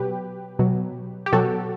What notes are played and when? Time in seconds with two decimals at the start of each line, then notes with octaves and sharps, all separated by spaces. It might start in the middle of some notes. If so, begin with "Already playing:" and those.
Already playing: B2 F#3 G4 B4
0.59 B2 F#3
1.26 G4
1.33 B2 F#3 F#4 A4